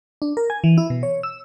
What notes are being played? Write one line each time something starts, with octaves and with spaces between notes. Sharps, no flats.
D4
A#4
G#5
E3
E4
B2
C#5
E6